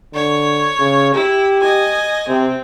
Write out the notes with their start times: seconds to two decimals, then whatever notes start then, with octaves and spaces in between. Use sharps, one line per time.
0.14 D3 C#5
0.79 C#3
1.15 E4 G4
1.61 D#5 G#5
2.28 C3 C4